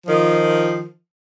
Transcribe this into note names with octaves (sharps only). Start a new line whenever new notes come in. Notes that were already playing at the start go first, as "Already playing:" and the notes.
D#3 F3